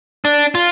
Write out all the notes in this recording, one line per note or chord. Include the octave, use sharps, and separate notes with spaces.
D4
F4